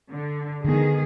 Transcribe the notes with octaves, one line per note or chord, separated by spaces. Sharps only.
D3
D3 D#3 G#3 B3 G#4